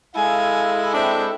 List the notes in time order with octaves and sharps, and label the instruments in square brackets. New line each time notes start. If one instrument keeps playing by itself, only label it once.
[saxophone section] G#3 E4 A4 [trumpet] F5 [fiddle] G#5
[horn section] C4 D4 G5 [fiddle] E5